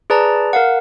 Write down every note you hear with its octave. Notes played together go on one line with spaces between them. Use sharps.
G#4 B4 D5 A5 A#5
A#4 F5 F#5